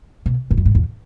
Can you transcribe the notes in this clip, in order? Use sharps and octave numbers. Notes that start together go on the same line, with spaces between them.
B2
G#2
F#2
G#2
E2